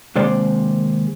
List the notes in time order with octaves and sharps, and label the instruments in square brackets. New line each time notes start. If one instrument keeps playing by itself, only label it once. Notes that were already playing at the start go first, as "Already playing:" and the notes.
[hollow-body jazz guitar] D#2 C3 G#3 C5 D5